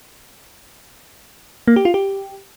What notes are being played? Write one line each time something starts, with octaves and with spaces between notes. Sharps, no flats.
A#3
G4
F4
G4